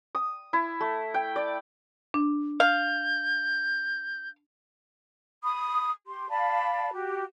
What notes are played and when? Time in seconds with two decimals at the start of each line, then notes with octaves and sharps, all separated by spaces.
0.15 D#6
0.53 E4
0.81 A3
1.14 G5
1.36 D5
2.14 D4
2.60 F5 G6
5.43 B5 D#6
6.06 G4 C6
6.30 D5 F5 A5 B5
6.93 F#4 G4